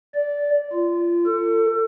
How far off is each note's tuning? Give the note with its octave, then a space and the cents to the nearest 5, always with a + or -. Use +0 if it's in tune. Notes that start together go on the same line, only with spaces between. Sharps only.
D5 -15
F4 -25
A4 +30